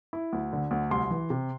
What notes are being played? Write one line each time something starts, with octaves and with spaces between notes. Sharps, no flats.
E4
D2
D3
D2
C2 C6
E3
C3